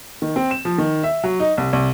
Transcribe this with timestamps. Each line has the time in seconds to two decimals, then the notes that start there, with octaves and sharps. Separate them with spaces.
0.22 D#3
0.36 C4
0.51 E7
0.65 F3
0.78 D#3
1.03 E5
1.24 F#3
1.40 D#4
1.58 C2
1.73 C2